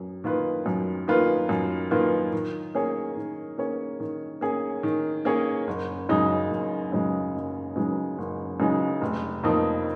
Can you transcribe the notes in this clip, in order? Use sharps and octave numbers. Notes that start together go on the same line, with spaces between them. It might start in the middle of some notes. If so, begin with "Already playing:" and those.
Already playing: F#2
D#3 A#3 F4 B4
F#2
D#3 A#3 F4 B4
F#2
D#3 A#3 F4 B4
D#3
A#3 C#4 G#4 C#5
D#3
A#3 C#4 G#4 C#5
D#3
A#3 C#4 G#4 C#5
D#3
A#3 C#4 G#4 C#5
F#1
F#2 C#3 G#3 D#4
F#1
F#2 C#3 G#3 D#4
F#1
F#2 C#3 G#3 D#4
F#1
F#2 C#3 G#3 D#4
F1
F2 F3 A#3 D#4